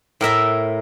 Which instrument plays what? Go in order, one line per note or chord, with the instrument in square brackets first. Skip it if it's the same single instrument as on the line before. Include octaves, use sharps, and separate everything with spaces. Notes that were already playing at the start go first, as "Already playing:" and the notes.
[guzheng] A2 A#4 E5 A#5